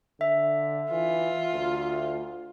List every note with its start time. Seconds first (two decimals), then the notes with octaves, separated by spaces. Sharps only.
0.21 D3 E5
0.91 E3 F4
1.54 D2